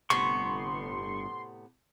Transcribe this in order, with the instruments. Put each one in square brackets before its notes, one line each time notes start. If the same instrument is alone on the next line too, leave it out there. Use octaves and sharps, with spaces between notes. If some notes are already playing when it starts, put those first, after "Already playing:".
[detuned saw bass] G1 [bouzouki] A2 C3 B3 [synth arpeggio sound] C6 [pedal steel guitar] C#6